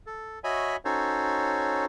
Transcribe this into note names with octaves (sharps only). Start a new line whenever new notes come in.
A4
F#4 C#5 D#5 E5 G#5 B5
C#4 D#4 F#4 A4 C5 C#5